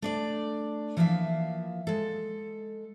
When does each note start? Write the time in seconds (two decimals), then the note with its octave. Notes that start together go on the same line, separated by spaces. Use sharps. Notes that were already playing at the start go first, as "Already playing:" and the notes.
0.02 A3 D4 D5
0.97 E3 F3 A#3 A4 E5 F5
1.87 G#3 A4